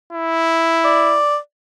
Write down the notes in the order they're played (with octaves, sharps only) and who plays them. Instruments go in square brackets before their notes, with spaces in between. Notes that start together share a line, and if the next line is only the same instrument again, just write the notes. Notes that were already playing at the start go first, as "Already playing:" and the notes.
[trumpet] E4
[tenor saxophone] D5